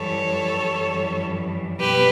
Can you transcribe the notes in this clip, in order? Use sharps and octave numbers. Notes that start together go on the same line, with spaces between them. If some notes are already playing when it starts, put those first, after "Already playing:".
Already playing: F#2 E3 G3 A4 C#5
F#2 E3 G3
B2 G3 G4 B4